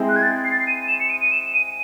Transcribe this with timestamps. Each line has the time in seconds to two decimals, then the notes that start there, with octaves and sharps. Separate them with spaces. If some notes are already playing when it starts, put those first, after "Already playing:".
Already playing: G#3 C4 E4
0.09 F#6
0.16 G#6
0.23 A6
0.45 C7
0.52 A6
0.60 C7
0.67 D#7
0.88 E7
1.00 C#7
1.10 D#7
1.21 D#7
1.32 E7
1.54 D#7